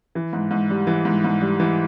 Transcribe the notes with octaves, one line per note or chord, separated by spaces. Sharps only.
E3
G#2
G#2
G3
E3
G#2
G#2
G3
E3